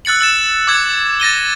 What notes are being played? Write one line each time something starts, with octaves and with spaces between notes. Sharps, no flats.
E6 F#6 A6 C#7 F#7
E6 A6 E7
D6 E6 G#6
A6 A#6 D#7 G7